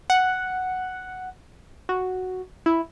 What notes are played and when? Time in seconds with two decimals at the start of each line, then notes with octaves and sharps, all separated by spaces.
0.10 F#5
1.89 F#4
2.66 E4